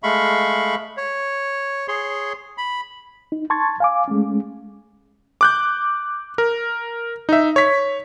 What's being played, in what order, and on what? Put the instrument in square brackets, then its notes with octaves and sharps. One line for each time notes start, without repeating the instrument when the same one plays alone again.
[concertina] G#3 A3 F5 B5 C#6
C#5
G#4 C#5 C6
B5
[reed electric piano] D#4
A5 C6 C#6 G#6 A6
F5 G#5 D6
G#3 A3 C#4
[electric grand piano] D6 F#6 G6
A#4
D#4 E5
C#5 B6